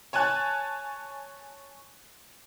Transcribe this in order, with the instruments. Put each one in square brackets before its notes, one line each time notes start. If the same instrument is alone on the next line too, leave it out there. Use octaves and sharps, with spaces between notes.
[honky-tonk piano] C#5 G#5 A5 F#6